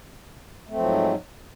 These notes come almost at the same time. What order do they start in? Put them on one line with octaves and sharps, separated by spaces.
A3 C4 F3 F#3 G#2